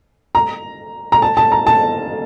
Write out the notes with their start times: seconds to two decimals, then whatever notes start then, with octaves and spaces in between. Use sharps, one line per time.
0.35 A#5
1.12 A#5
1.22 A5
1.37 A5
1.52 A#5
1.67 A5